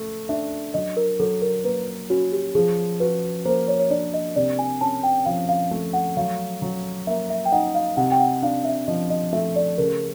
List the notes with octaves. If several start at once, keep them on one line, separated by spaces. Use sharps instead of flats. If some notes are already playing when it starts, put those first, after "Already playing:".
Already playing: A3
D4 E5
F#3 D#5
A#4
F#3 A4
A#4
A#3 B4
C#4 F#4
G4
F3 G#4
F#4 B4
A#3 C5
C#5
C#5
D4 D5
D#5
C3 D5
G#5
C#4 A5
G5
F3 F5
F5
A3
F#5
F#3 F5
F#3
A#3 E5
E5
G5
D#4 F#5
F5
C3 F#5
G5
F#5
D4 F5
E5
F3 D#5
D#5
A3 E5
D5
C#3 A#4